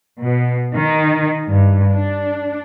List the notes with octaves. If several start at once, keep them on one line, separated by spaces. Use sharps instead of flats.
B2
D#3
G2
D4